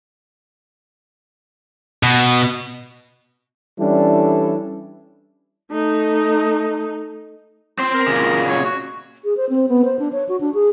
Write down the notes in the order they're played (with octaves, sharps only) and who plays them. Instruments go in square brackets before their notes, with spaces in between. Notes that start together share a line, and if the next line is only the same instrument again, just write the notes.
[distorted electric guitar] B2
[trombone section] E3 G3 C#4 D4 E4 A4
[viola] A3 D#4
[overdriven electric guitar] C4 C5 [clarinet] F4
[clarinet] A#4
[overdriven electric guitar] A#2 C#3
[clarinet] C#5
F#4
[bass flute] G#4
C5
C4
B3
C5
D4
C#5
F#4
D4
G#4